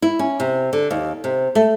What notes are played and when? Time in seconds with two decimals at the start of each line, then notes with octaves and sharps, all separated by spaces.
0.02 E4
0.19 C#4
0.40 C3
0.73 D3
0.91 D#2
1.24 C3
1.55 A3